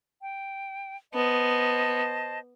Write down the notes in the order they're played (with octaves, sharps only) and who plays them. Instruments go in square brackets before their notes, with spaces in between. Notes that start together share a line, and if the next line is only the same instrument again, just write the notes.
[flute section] G5
[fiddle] B3 [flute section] C5 D#5 A5